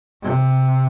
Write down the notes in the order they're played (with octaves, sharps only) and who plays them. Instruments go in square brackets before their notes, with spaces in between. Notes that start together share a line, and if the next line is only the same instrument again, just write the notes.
[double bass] C3